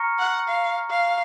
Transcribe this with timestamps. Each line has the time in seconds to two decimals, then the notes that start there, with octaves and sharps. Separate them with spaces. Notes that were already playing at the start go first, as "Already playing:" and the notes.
Already playing: A#5 C#6 F6 A#6 C#7
0.19 F#5
0.48 F5
0.90 F5